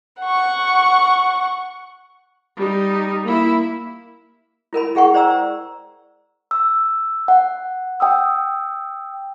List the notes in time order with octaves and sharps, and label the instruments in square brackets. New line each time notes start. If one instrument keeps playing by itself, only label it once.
[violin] F#5 C#6
[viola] G3 D#4
A#3 E4
[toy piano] E4 A#4 G#5 B5
E4 G#4 F#5 G5 C#6
C5 D5 A#5 E6
[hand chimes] E6
F#5
G5 D#6 E6